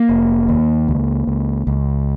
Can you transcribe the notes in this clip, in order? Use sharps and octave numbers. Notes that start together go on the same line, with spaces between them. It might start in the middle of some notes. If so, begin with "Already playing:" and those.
Already playing: A#3
F1
D#2
C#2
C#2
C#2